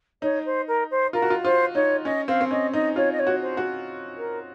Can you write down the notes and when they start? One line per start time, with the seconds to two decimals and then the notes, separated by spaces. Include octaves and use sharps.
0.22 D#4 C#5
0.46 C5
0.68 A#4
0.91 C5
1.13 F4 A#4
1.22 F#4
1.30 F4
1.44 F4 C5
1.75 D#4 C#5
2.05 C#4 D#5
2.28 C4 F5
2.41 C4
2.51 C#4 D#5
2.73 D#4 D#5
2.96 F4 C#5
3.12 D#5
3.19 C#5
3.27 F#4
3.42 C5
3.57 F#4
4.17 A#4